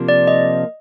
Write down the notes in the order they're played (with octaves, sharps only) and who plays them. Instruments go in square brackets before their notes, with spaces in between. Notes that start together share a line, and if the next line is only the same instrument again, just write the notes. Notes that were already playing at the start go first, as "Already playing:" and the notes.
Already playing: [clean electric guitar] C3 F3 A#3 D4 F4
[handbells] D5
D#5